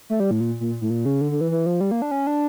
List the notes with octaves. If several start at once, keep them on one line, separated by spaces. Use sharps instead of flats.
A3
G3
A2
A#2
A#2
A2
A#2
C#3
D3
D3
E3
E3
F3
G3
A#3
D4
C#4
D4